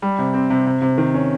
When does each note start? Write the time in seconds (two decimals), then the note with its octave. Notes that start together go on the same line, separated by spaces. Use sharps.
0.02 G3
0.19 C3
0.34 C4
0.50 C3
0.66 C3
0.82 C3
0.98 D#3
1.14 C#4